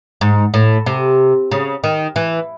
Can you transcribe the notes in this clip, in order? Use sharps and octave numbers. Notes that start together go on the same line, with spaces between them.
G#2
A2
C3
C#3
D#3
E3